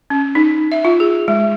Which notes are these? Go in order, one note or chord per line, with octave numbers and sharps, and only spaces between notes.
C#4
D#4
E5
F4
G#4
G#3